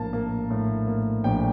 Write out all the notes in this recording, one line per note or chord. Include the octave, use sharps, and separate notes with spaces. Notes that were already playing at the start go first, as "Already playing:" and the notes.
Already playing: A#1 A2 A#3 A5
A#3
A2
A#3
A#1 G5